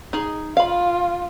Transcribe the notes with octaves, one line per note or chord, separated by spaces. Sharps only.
D#4 G#4
F4 F5 B5